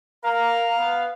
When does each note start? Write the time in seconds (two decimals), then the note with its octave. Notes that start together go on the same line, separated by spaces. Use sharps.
0.24 A#4 F5 A#5
0.78 B3